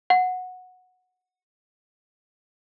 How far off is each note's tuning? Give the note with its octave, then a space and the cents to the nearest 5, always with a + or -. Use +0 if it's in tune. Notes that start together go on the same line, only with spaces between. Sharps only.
F#5 -10